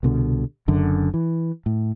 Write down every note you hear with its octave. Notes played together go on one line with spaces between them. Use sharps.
C2 B2 D3
F#1 F#2 D3
E3
A2